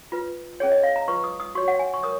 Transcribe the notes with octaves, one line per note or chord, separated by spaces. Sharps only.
F4 B4
C#4 G#4 C#5
D#5
F5
A#5
F4 B4 C#6
D#6
D#6
F#4 C#5 C#6
F#5
G#5
C#6
A#4 C#5 D#6